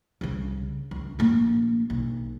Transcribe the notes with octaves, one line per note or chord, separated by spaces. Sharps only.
C2 C#3
C#2
A#1 A#3
B1